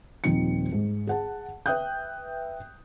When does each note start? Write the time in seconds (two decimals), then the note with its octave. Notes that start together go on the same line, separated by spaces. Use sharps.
0.24 D#1 F3 C4 D#4 C#7
0.72 G#2
1.07 G#4 F#5 A5
1.66 B4 E5 G5 D#6 F#6 G6